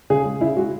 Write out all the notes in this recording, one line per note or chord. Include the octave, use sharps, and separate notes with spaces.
C#3 G#4
G#3
C#3 E4
G#3 F#4